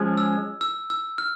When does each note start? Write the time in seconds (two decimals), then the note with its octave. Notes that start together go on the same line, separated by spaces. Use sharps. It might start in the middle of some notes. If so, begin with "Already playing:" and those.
Already playing: F3 G#3 C#4
0.17 E6
0.61 E6
0.90 E6
1.18 F6